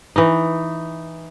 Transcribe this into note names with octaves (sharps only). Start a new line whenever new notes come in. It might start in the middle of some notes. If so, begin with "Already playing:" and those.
E3 D#4